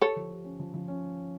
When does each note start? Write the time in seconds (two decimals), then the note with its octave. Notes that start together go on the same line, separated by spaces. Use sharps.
0.01 G4 A4 C#5
0.16 F3
0.31 G4
0.44 C#4
0.60 F3
0.74 F3
0.88 C#4